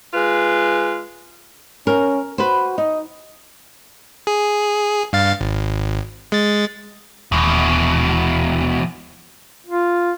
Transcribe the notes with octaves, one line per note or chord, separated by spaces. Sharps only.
G#3 F4 B4
C#4 A#4
F#4 B4 C5
D#4 D#5
G#4
G2 F5 A6
G#1
G#3 A6
D#1 E2 B2
F4